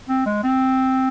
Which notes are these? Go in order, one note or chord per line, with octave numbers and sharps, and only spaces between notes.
C4
G#3
C4